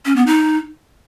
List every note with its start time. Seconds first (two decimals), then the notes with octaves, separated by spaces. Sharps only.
0.05 C#4
0.16 B3
0.27 D#4